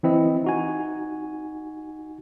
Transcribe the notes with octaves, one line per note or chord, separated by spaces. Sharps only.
E3 C4 E4 D#5
D#4 F#4 G#5